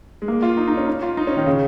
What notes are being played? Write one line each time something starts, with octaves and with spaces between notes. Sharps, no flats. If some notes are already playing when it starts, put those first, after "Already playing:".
G#3
A#3
F4
D#4
D#4
C#4
D#4
F4
D#4
C#4
D#3
C#3